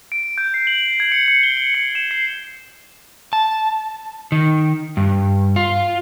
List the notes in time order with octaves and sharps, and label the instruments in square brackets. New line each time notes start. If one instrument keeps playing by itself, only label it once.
[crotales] D7
G6
C7
F#7
G#6
C#7
C#7
G7
G7
C#7
E7
C7
[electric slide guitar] A5
D#3
G2
F4